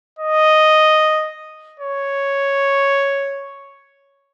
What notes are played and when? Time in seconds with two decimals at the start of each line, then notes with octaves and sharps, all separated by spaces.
0.19 D#5
1.80 C#5